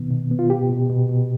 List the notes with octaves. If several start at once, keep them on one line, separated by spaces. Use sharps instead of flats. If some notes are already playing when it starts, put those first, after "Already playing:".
Already playing: B2 D#3 B3
B2
B3
F4
B2 G4
B2
B2
B2